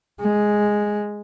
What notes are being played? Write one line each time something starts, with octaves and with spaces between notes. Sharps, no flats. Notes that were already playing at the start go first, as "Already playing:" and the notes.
G#3